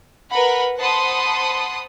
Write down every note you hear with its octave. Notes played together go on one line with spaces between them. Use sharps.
A#4 B4 F#5 B5
C5 F#5 A5 B5 C6 D#6